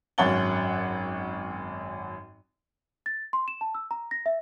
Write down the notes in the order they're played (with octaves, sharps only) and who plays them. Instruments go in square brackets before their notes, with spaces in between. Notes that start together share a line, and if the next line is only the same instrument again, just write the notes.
[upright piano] G#1 F#2 C#5 F#5 A6 G7
[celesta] A6
C6
E7
A5
E6
A#5
A#6
E5